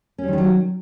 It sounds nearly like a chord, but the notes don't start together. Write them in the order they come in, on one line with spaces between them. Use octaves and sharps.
C#4 G3 D#3 E3 F#3